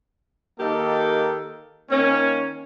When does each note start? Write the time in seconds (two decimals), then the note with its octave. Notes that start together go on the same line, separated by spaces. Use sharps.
0.59 D#3 A#3 D#4 G4 A4
1.90 D#3 A#3 C#4